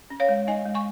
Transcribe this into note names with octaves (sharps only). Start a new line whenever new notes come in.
C#4
C#5 F5
G#3
D#4 D#5 G#5
G#3
G#5 C#6